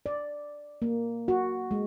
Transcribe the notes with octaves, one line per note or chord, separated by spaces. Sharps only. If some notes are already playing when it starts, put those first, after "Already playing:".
D5
A#3
F#4
G#3